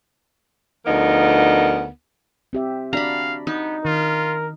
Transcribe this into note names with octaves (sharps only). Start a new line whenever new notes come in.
D2 F3 B3 D#4 A#4
C4 G4 E5
D4 F#4 D5 F5 A#5 B5
B3 D#4
D#3 F4 A#4